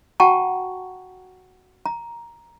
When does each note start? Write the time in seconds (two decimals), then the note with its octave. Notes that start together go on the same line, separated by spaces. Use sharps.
0.20 F#4 F#5 G5 A5 A#5 C#6
1.86 A#5